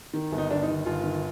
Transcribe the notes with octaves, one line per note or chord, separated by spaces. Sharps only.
D#3
G1
D#4
G1 D4
D#4
D#3
G1 F4
D#3